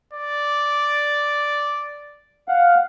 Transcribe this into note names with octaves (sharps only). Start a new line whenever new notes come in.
D5
F5 F#5